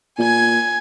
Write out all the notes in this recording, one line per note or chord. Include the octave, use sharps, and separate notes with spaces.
A#2 G#5 G#6